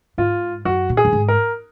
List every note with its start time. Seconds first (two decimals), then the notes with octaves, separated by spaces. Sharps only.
0.18 G#2 F4
0.65 F#2 F#4
0.89 A#2
0.97 G#4
1.05 F#2
1.13 G#2
1.28 A#4